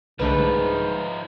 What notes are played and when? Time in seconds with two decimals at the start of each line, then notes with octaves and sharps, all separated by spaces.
0.19 C2 G#2 D3 F3 A3 D#4 B4